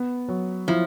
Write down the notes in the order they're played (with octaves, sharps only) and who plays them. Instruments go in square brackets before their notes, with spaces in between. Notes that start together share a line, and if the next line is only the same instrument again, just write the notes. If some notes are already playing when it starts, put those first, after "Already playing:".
Already playing: [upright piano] B3
F#3
[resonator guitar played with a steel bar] F3 [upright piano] E4